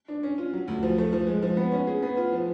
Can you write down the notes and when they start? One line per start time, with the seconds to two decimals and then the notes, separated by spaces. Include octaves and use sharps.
0.08 D4
0.23 C#4
0.38 F4
0.53 F#3
0.68 D2
0.83 F3
0.98 A3
1.13 F3
1.27 G#3
1.42 F3
1.57 B3
1.72 C#4
1.87 G#4
2.02 B3
2.17 F4
2.32 F3